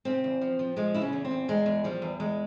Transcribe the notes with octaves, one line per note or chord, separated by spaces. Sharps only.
C#3 C4
E2
F3
F3
F3 G#3
C#3 E4
C#4
E2
C4
E2
E2 G#3
E2
F3 G3
E2
E2 G#3